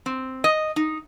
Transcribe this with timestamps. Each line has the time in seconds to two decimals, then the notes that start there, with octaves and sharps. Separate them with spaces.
0.06 C4
0.44 D#5
0.76 D#4